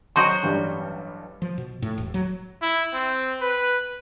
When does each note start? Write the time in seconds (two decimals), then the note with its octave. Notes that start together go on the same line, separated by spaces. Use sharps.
0.16 F#3 F#4 D#5 C6 G6
0.43 A1 G2 G3
1.42 F3
1.58 B2
1.82 A2
1.98 E1
2.14 F#3
2.62 E4
2.94 C4
3.41 B4